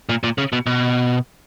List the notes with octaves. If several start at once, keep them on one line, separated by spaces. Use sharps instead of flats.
A#2
A#2
C#3
B2
B2